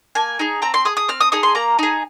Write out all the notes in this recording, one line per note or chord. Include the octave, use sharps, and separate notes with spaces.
A#3 G#5
D#4 G#4
C4 A#5
C6
G#4 D#6
D#6
C4 F6
D#6
D#4 G#4 D#6
C6
A#3 A#5
D#4 G#4